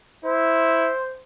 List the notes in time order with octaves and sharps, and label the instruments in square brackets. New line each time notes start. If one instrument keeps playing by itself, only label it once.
[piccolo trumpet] E4 [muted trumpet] C5